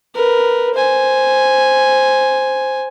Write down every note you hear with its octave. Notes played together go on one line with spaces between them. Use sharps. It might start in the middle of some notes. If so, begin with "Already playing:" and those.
A#4 B4
C5 G#5